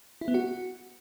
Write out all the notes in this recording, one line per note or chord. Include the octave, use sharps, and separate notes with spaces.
E4
B3
F#4